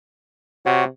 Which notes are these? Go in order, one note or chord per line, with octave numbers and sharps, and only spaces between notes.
C3 F#4 C#5 F#5